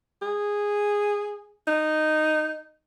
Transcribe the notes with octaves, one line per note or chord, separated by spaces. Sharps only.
G#4
D#4